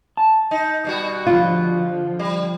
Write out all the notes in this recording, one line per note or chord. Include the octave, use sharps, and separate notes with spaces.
A5
D#4
B2 G3 F#4
D3 F3 F4
G3